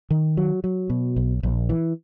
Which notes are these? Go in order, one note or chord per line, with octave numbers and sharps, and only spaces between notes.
D#3
F#3
F#3
B2
B1
A#1
E3